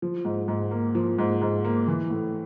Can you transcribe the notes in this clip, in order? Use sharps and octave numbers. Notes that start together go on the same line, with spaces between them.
F3
G#2
G#2
A#3
F3
G#2
G#2
A#3
E3
A2